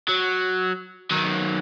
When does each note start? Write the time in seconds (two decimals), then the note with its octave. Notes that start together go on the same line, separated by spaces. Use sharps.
0.08 F#3
1.11 D#3 F#3